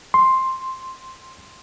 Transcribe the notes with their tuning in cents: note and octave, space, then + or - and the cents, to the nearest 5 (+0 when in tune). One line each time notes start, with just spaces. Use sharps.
C6 +5